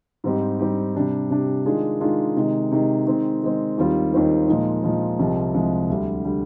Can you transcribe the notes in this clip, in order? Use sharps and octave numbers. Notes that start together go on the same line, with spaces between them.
G#2 G3 C4 D#4 G4
G#2 G3 C4 D#4 G4
C3 G3 D4 G4
C3 G3 D4 G4
D#3 G#3 D4 F4 G#4
D#3 G#3 D4 F4 G#4
C3 D#3 G#3
C3 D#3 G#3
D#3 G#3 C4
D#3 G#3 C4
D#2 D#3 G3 C4 F4
D#2 D#3 G3 C4 F4
A#2 F3 G#3 D#4
A#2 F3 G#3 D#4
C2 C3 F3 G#3
C2 C3 F3 G#3
D2 D3 G3
D3 G3